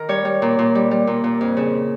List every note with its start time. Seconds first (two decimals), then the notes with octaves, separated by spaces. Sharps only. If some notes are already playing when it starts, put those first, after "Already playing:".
Already playing: D#3 A#4
0.09 G3 C#5
0.25 G3
0.42 A#2
0.59 A#2
0.75 G3
0.91 G3
1.07 A#2
1.24 A#2
1.41 F2
1.57 C#3